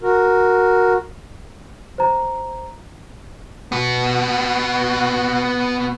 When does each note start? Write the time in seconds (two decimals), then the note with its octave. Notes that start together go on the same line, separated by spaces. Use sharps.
0.02 F#4 A#4
1.98 C5 A#5
3.72 B3 F#4